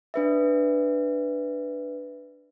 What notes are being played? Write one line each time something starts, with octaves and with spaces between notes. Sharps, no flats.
D4 B4 E5